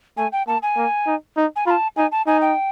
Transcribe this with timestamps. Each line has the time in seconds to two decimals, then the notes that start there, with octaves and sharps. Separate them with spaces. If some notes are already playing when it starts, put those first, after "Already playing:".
0.17 A3 G#5
0.32 G5
0.47 A#3 A5
0.63 G#5
0.77 A#3
1.07 D#4
1.37 D#4
1.56 G#5
1.66 F4 B5
1.70 A5
1.96 D#4 G#5
2.12 A5
2.27 D#4 G#5
2.41 G5